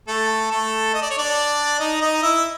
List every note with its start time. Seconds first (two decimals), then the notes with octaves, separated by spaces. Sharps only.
0.08 A3 A4
0.51 A3 A4
0.94 D#5
1.02 D5
1.11 C#5
1.18 D4 D5
1.80 D#4 D#5
2.01 D#4 D#5
2.23 E4 E5